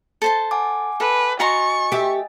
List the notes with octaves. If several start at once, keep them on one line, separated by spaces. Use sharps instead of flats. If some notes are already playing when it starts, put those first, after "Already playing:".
A4 C5 A5
F#5 G#5 D6
A4 B4
F#4 D#5 G#5 A#5 C6 C#6 A6
G4 E5